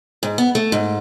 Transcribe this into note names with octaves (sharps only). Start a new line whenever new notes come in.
G#2
B3
A3
G#2